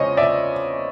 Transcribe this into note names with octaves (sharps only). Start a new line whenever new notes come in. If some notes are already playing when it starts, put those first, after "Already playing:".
Already playing: E2 C#3 F3 G#3 C5 C#5 D#5
D5 E5